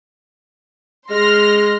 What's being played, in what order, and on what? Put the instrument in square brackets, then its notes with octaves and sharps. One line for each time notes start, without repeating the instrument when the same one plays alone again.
[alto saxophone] G#3 [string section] C6 F6 A#6